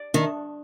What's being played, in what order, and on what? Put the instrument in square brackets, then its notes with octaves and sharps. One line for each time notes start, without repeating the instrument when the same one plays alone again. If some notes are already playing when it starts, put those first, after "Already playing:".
Already playing: [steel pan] D5
[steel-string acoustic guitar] D#3 [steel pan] D4